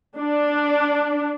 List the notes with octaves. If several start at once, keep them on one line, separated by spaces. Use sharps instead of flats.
D4